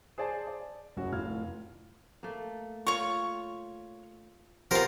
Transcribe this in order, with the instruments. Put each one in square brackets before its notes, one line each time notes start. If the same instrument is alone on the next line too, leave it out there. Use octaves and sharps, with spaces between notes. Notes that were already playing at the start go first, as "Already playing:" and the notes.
[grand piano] G#4 C5 D5 G#5 A5
D5
F#1 C#4 F#4 C#5
F1 A2 F4 F5 F6 G#6
[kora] A3 A#3
[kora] F4 [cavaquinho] C#5 C#6
[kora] F3 B3 G4 [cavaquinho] D#4 F4 [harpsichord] A#4 C5